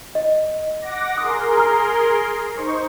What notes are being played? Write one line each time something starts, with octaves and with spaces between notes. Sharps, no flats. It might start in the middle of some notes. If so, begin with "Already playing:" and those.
D#5
F#5 D6 A#6
G#4 A#4 C6 D#6
A#5 F6
D#4 C5 C#6